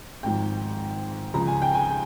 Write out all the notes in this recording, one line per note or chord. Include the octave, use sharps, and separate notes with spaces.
G#1 G#2 F3 G5
C#2 C#3 F3 A#5
G#5
G5
G#5